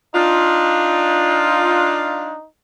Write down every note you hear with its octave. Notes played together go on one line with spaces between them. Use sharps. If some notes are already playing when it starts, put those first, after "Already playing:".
D4 D#4 F4